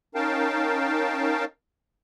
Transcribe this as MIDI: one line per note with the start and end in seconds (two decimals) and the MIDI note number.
0.15 1.45 61
0.15 1.45 63
0.15 1.45 70
0.15 1.45 77
0.15 1.45 79
0.15 1.45 81